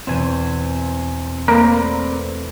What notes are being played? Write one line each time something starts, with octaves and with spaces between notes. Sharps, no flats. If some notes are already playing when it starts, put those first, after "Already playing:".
E2 B2 C4 G#5
A3 A#3 C4 B4 D5 A#6